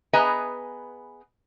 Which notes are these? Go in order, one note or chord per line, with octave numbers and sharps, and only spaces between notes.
B3 G#4 B4 D#5 G#5 A#5